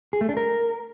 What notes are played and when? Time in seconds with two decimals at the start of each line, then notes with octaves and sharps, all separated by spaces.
0.13 G#4
0.21 A3
0.29 D4
0.37 A#4